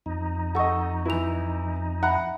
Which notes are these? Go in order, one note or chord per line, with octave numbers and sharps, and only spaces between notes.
F2 D#4
A4 D#5 F#5 C#6
E3 E4 B4 F7
E5 F#5 A#5 B5 F#6